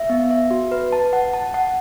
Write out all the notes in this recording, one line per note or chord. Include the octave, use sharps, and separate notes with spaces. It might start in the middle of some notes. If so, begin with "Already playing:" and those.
Already playing: E5
B3
E5
F#4
B4
A5
F#5
A5
F#5